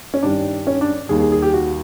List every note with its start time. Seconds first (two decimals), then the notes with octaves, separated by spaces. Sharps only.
0.14 C#4
0.23 G2 D#3 G3 D4
0.67 C#4
0.81 D4
1.09 D#2 D#3 G3 G#4
1.20 G#4
1.32 G#4
1.42 G4
1.54 F#4